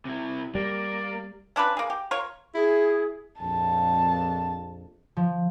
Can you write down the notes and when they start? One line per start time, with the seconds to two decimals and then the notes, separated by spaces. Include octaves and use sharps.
0.05 C3 E4
0.55 G3 A#3 D5
1.56 C#4 D4 F4 B4
1.77 A#3 G#4
1.90 G4
2.11 F4 A#4 C#5
2.55 E4 G#4
3.40 A#1 F2 A5
5.17 F3